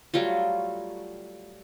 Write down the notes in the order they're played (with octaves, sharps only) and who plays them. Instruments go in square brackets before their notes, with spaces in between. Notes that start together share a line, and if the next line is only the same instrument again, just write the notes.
[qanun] F#3 G3 A3 F4